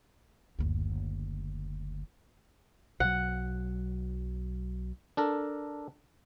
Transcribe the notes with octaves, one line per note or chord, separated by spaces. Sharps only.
F#1 D2
B1 F#3 F#5
D4 A4 A#4